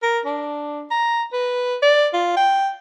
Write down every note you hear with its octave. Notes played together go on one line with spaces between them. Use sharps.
A#4
D4
A#5
B4
D5
F4
G5